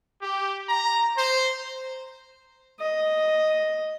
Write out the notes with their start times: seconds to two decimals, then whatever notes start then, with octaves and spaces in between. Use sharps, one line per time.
0.21 G4
0.68 A#5
1.15 C5
2.80 D#5